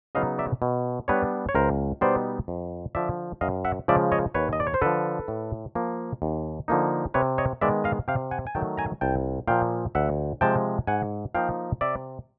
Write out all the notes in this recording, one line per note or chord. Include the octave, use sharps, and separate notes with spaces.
C#3 F#3 B3 D#4 D#5 F5
D5 E5
B2
G3 B3 D4 B4 C#5
C#5
C#2 A#4 C5
B2 G3 B3 D#4 C5 D5
F2
D3 F3 D5 E5
F#2 D#5 F5
E5 F#5
C#3 F3 G#3 D5 E5
C#5 D#5
D#2 B4 C#5
D#5
D5
C#5
C5
D3 F3 A4 B4
A2
F3 A#3
D#2
D3 F3 A#3 D#4
C3 B4 C#5
C#5 D#5
D#3 G#3 B3 D5 E5
D#5 F5
C3 F5 G5
F#5 G#5
G#5
D#3 F#3 A3 G5 A5
G#5 A#5
C2 G5 A5
A#2 F3 A#3 F5 G5
D2 E5 F#5
C3 F3 G#3 G5 A5
G#2 F#5 G#5
F3 A#3 D#4 F5 G5
C3 D5 E5